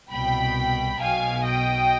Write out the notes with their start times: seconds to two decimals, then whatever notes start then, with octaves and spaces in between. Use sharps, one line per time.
0.10 C2 B2 G5 B5
0.99 B1 B2 F5 G#5
1.45 D#5 G5